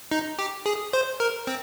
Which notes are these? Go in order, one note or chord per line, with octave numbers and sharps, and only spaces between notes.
D#4
G4
G#4
C5
A#4
C4